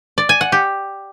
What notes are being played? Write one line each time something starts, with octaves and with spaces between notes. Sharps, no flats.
D5
G#5
F#5
G4